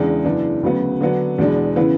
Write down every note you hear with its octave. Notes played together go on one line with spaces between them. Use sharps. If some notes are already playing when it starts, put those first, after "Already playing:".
Already playing: E2 C#3 G#3 D4
F#2 C#3 E3 B3 D4
D2 C#3 F#3 B3
D3 F#3 B3 D4
E2 B2 G#3 D4
C#3 E3 B3